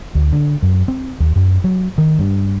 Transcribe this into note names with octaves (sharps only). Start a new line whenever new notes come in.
D2
D3
F#2
C4
D#2
F#2
F#3
D#3
G2